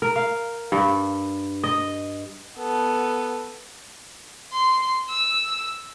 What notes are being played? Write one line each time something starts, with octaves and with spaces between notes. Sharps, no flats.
A#4
F5
G2
D#5
B3 A4
C6
E6